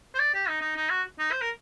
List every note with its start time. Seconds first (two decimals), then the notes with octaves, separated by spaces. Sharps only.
0.15 C5
0.19 D5
0.34 G4
0.48 D#4
0.61 D#4
0.76 D#4
0.90 F#4
1.19 D#4
1.32 C5
1.41 A#4